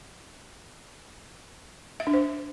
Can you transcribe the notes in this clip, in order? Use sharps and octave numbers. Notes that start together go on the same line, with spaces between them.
E5
D4
C5